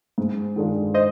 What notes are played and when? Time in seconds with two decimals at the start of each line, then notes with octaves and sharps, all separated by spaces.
0.18 G#2
0.56 D#3 G#3 D4 F4
0.94 C5 D#5